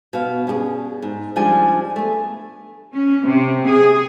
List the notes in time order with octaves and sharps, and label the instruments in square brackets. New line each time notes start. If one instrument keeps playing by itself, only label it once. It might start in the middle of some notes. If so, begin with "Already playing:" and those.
[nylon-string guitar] B2 F5
C#4 D4 G4 G#4
G#2
C#3 F3 G3 G#3 D4 G#5
A3 B3
[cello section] C#4
C3
G#4